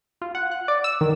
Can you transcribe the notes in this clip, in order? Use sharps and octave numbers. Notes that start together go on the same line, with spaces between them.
F4
F#5
F#6
D5
E6
D#3